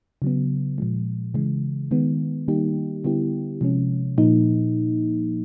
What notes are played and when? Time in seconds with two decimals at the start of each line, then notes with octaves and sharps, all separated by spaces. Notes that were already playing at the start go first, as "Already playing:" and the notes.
0.22 C#3 F#3 B3
0.78 A#2 F3 G#3
1.34 C#3 E3 G#3
1.91 D#3 G#3 B3
2.48 D#3 G3 A#3 D#4 G4
3.04 D3 G3 B3 E4 G4
3.61 C3 F3 G#3 C#4
4.18 A#2 F3 A#3 D#4